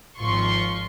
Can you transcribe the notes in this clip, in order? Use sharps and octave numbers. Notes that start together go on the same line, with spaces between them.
G#1 F3 F4 C6 C#6